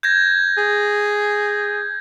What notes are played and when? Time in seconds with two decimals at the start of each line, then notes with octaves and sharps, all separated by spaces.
0.03 G6 G#6 A#6
0.58 G#4